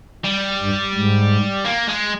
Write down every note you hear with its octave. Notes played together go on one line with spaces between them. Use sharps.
G3
G2
G#2
A#3
G#3